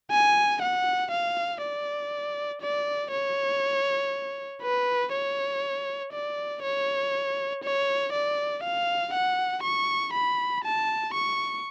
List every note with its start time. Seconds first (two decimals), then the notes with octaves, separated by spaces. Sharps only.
0.11 G#5
0.62 F#5
1.11 F5
1.61 D5
2.61 D5
3.11 C#5
4.62 B4
5.12 C#5
6.12 D5
6.63 C#5
7.64 C#5
8.13 D5
8.63 F5
9.14 F#5
9.63 C#6
10.13 B5
10.64 A5
11.14 C#6